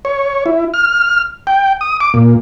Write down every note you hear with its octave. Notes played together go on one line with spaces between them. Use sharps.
C#5
E4
F6
G5
D#6
D6
A#2